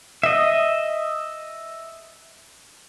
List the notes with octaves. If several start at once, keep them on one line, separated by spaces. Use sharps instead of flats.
D#5 E5